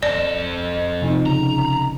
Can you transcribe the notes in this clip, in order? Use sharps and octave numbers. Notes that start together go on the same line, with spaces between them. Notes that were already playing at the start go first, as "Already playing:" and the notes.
F2 A4 D5
C3 F3 D#4
C#3 A#5